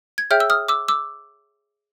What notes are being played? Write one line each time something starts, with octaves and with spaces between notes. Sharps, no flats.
G#6
G#4 C#5 E5 G5 F6 G6
E6
D#6 F6
D6 E6
D6 E6